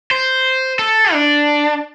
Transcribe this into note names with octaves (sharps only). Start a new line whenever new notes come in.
C5
A4
D4